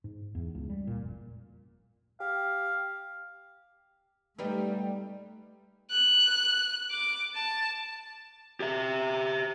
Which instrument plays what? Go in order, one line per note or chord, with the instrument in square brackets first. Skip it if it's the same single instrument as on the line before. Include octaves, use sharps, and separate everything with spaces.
[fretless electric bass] G#2
E2
C#2
G3
A#2
F1
[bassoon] G4 [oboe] F5
[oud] G3 B3 D#4 [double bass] A3
[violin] F#6
D6
A5
[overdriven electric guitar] G4 E5